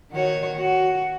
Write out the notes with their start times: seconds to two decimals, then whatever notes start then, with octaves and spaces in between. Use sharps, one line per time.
0.11 D#3 F#4 C#5
0.58 F#4